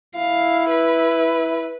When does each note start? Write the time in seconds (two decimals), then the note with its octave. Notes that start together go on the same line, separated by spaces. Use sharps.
0.16 E4 F5
0.71 B4